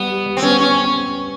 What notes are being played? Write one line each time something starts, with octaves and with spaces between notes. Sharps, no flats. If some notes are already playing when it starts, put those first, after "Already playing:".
Already playing: G3 B3
G4
G3
C4
B3 C#4
B3 C#4